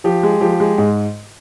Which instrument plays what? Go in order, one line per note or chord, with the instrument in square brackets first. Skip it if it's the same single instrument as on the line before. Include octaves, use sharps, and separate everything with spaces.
[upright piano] F3 G4
G#3
F3 G4
G#3
G#2